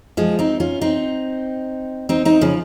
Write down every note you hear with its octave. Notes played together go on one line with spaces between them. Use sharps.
F3 G#3
C4 D#4
C#4 F4
C4 D#4
C4 D#4
C4 D#4
C#3 F3